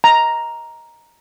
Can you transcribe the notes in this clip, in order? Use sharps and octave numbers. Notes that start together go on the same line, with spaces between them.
A#5